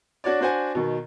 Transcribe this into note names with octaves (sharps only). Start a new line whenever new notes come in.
D4 F#4 C#5 D5
D4 F#4 C5 F#5 G#5
B2 D#3